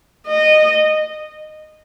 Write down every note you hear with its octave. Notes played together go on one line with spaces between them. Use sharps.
D#5